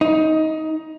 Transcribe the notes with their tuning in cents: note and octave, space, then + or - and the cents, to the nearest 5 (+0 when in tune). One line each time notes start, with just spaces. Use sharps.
D#4 +15